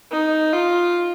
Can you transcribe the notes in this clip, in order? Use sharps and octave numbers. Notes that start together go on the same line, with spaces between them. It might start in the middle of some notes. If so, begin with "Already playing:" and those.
D#4
F4